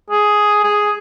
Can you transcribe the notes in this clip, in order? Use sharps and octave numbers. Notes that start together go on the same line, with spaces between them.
G#4
G#4